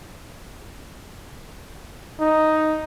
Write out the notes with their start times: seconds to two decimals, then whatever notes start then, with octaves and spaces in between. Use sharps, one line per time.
2.20 D#4